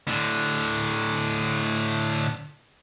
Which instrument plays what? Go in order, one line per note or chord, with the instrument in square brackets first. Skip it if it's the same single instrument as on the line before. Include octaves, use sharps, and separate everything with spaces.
[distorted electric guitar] A2 D3